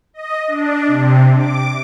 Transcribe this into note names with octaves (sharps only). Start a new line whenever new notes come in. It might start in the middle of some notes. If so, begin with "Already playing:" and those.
D#5
D4
C3
D6